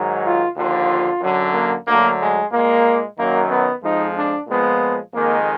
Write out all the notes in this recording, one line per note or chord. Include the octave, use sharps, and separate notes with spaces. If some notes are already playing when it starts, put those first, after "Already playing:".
Already playing: G#2 D#3 F#3
F4
D#2 D3 F3 F4
F#2 D3 F#3
A#3
D2 D3 F#3 A#3
G#3
A#2 G#3 A#3
F#2 D#3 F#3 A#3
B3
F2 F3 G#3 D#4
D4
A#2 F3 G#3 B3
F2 D#3 G#3 A#3